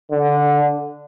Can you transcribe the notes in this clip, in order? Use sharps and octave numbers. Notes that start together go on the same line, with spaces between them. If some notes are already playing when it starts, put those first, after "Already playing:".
D3